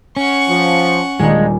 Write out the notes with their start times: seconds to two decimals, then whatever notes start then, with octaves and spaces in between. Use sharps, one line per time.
0.17 C#4 F#5 C#6
0.49 F3
1.20 D#1 F3 G#3 D4 D#4 G#5